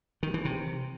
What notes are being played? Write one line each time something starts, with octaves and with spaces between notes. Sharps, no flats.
D#3
E3
C3